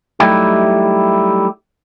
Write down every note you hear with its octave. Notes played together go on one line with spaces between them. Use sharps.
F#3 G3 A3 D#4 E4 G4